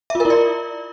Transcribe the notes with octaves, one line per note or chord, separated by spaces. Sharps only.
E5
F4
A#4
E4
D5